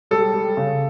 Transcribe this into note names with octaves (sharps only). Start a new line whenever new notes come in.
G3 A4
G3
C#3